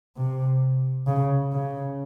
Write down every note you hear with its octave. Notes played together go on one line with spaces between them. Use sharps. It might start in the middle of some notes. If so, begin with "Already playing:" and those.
C3
C#3
C#3